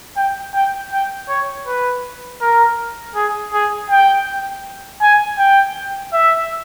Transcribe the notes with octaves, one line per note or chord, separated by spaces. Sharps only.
G5
G5
G5
C#5
B4
A#4
G#4
G#4
G5
G#5
G5
E5